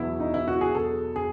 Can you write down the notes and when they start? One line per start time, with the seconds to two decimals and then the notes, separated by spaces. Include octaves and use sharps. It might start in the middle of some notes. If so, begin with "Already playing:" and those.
Already playing: E2 B2 F#3 E4
0.20 D#4
0.34 E4
0.48 F#4
0.61 G#4
0.75 A4
1.16 G#4